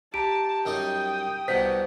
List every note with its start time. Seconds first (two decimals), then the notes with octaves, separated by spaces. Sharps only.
0.14 G4 A5 A#5 D7
0.65 F#2 G3 D#4 G5 D#6
1.48 C2 B2 C5 F#5 B6